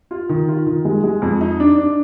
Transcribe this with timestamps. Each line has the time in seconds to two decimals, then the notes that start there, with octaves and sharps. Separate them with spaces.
0.11 F4
0.29 D#3
0.48 F4
0.66 D#3
0.85 G#3
1.04 G#3
1.22 F2
1.41 D#4
1.60 D4
1.78 D4